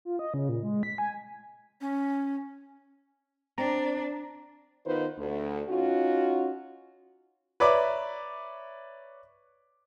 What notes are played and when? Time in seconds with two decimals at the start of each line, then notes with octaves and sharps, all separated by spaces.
0.05 F4
0.19 D#5
0.34 C#3
0.49 A#2
0.63 G#3
0.83 B6
0.98 G#5
1.81 C#4
3.58 C4 D4 A#5
4.85 D#3 B3 D#4 F4 B4 C5
5.18 D2
5.68 C#4 D#4 F4 F#4
7.60 B4 C#5 D5 E5 A#5 D6